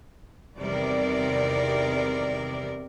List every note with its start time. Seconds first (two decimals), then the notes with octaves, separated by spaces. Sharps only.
0.59 E2 C3 D#3 G3 A#4 D5